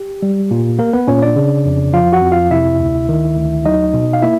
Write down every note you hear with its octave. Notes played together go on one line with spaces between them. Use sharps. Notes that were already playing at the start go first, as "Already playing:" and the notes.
Already playing: G4
G3
A#2
A#3 A#4
B3 B4
A#2 C#4 C#5
D4 D5
C#3
F2
F3 F4 F5
F#4 F#5
F2
F4 F5
C3 E4 E5
D2
D#3
D2
F#3 D#4 D#5
B2
F5
A#3 E4 E5